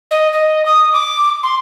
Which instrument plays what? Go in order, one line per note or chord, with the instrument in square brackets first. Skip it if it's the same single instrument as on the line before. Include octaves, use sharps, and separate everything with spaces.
[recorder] D#5
D#5
D#6
D6
C6